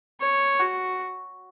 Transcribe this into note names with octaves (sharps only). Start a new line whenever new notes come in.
C#5
F#4